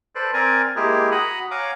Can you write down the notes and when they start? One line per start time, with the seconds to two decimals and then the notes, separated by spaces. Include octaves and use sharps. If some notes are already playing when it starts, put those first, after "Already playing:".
0.15 A4 B4 C5 D5
0.34 C4 A#4 D5 G#5
0.76 G#3 A#3 E4 G4 G#4
1.12 F#4 F#5 A#5 B5 D#6
1.51 C#5 F5 F#5 G#5 A#5 D6